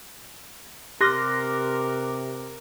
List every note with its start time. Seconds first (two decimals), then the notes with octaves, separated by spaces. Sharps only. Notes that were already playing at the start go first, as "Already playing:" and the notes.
1.01 C3 G4 A#4 C6 D6 F6 F#6 A#6